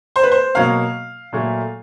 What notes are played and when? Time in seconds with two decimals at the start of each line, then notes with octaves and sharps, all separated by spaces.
0.16 C5
0.23 B4
0.32 C5
0.54 B2 F#3 A#3 F5
1.33 A#2 F#3 A3